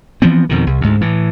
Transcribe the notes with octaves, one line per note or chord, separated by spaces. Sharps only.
E3 F3 B3 C4
F2 B2 D#3
C2
D2 G#2
A2 E3